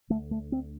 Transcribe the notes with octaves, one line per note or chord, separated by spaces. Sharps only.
D2 D3 A3
A3
C4